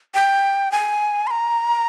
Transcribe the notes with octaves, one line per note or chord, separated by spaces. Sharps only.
G5
G#5
C6
A#5